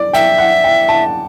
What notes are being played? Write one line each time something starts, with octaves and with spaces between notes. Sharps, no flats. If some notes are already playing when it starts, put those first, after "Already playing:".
Already playing: D5
E5 G5
F#5
G5
A5